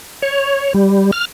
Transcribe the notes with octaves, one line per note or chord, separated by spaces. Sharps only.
C#5
G3
F6